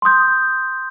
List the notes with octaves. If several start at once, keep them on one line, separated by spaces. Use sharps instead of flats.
C6 D#6 G6